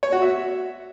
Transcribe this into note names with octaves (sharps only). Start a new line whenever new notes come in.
C#5
F#4
E5